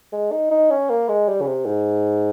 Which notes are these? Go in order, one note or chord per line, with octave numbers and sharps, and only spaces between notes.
G#3
D#4
D#4
C#4
A#3
G#3
G3
C#3
C3
G#2